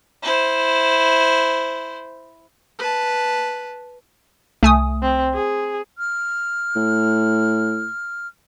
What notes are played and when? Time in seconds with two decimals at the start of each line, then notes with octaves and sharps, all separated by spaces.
0.23 E4 C5
2.79 B4 A5
4.63 C2 A3 G#5 D#6
5.02 C4
5.34 G#4
5.98 F6
6.76 A2